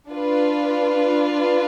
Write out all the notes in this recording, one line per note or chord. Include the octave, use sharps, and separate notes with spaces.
D4 F4 B4